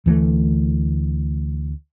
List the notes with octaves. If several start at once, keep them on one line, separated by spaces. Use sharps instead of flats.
D2 E3 F3 A3